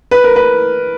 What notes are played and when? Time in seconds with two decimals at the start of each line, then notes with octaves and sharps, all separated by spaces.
0.11 B4
0.24 A#4
0.36 B4